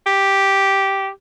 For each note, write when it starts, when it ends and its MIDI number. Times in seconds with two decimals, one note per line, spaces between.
0.07 1.09 67